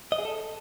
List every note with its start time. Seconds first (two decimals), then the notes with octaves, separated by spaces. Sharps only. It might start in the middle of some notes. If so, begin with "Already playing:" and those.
0.12 D#5
0.19 G#4
0.25 A4